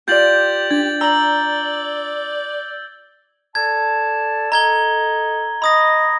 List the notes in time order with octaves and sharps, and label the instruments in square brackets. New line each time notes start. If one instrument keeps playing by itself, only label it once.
[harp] F4 D5 [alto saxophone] G4 [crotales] G6 A6 F#7
[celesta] D4 [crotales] G#6
[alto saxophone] D5 [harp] A#5 [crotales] E6 F#7
[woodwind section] A4 D5 A5 [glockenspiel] G#6
[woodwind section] A4 D#5 [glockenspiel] A#5 G#6 G7
[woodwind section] D#5 [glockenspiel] B5 D#6 A#6